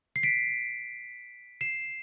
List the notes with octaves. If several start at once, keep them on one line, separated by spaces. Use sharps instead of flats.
C7
B6 D7
C7 E7